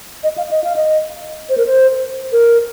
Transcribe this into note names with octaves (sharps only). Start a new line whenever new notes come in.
D#5
F5
D#5
F5
D#5
C5
A#4
C5
A#4